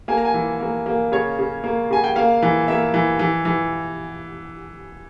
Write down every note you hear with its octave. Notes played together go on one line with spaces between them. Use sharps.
A#3 G#5
A#5
G#5
E3
A#3
A#3
C#3 C#5
C#3
A#3
C#3 G#5
G5
A#3 F5
E3
A#3 E5
E3
E3
E3